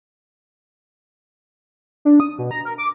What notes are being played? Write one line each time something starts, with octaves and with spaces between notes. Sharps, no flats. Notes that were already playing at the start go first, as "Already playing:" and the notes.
D4
D#6
B2
A#5
A#4
D6